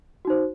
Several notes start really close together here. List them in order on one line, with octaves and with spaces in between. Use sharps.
F#4 D#4 C5